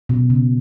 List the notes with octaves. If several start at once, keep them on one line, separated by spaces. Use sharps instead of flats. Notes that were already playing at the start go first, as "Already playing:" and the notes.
B2
C#3